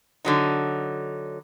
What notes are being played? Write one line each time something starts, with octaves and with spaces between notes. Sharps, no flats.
D3 F#3 D#4